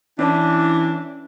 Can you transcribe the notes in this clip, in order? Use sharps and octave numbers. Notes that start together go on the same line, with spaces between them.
E3 C#4 D4 C#5 A5